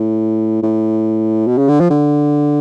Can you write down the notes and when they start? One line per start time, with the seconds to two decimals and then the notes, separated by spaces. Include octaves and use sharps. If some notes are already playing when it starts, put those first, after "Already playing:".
Already playing: A2
0.63 A2
1.47 B2
1.58 C#3
1.69 D3
1.80 F3
1.90 D3